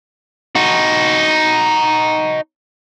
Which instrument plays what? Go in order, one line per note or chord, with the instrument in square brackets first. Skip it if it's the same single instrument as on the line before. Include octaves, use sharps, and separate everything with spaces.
[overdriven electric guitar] D#4 F#4